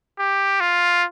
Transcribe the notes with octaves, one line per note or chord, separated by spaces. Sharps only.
G4
F4